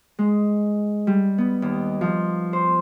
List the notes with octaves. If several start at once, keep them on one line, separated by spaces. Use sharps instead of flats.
G#3
G3
B3
D#2
F3
C5